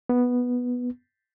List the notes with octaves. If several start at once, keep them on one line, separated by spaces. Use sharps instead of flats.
B3